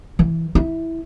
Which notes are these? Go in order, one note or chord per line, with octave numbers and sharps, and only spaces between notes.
E3
E4